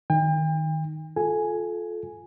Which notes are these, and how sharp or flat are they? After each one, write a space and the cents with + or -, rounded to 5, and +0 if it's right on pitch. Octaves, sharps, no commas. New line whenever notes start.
D#3 +0 G5 +40
F4 +10 A4 -25 G#5 +0